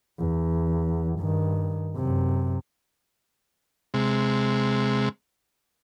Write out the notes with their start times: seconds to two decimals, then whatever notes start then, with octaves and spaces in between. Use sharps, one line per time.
0.19 E2
1.20 G2 D#3
1.96 F#2 C3
3.94 C3 G#3